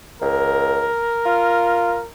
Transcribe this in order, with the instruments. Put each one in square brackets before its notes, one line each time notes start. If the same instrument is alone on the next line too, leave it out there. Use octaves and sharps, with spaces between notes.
[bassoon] C#2 [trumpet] A#4
[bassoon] F4